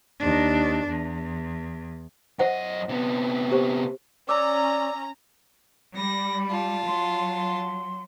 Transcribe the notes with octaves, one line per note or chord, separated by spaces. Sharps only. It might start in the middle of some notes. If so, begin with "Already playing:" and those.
D#2 D4
E2
F#2 C5 D#5 E5 F#5
C3 B3
G4 C5
C#4 D5 A#5 D6 E6
G3 B5 A#6
F4 A5
F#3 C6
C6